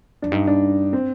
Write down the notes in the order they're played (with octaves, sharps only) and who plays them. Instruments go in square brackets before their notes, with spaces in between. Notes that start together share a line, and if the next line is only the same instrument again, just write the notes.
[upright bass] F2 [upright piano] D4
[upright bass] G2 [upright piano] D#4
[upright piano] D4
C4